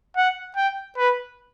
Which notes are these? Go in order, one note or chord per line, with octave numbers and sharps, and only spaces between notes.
F#5
G5
B4